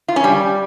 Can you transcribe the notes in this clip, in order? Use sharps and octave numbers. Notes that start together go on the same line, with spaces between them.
F4
C#4
G3